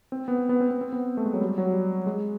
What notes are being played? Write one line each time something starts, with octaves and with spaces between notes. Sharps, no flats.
C4
B3
C4
B3
C4
B3
C4
B3
A3
G#3
F#3
G3
F#3
G3
G#3